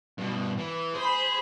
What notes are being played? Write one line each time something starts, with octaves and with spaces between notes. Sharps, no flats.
G2 B2
E3
G#4 C5 B5